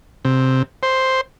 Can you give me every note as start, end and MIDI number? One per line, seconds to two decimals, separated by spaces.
0.25 0.62 48
0.83 1.21 72